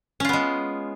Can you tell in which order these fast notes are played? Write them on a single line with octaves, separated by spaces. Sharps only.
C#4 F4 B3 G#3